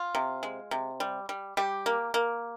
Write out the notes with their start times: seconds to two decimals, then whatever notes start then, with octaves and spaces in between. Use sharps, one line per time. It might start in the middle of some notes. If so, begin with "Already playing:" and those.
Already playing: F4
0.15 C3
0.43 G#3
0.71 C3
1.00 G3
1.29 G3
1.57 G3 G4
1.86 A#3
2.14 A#3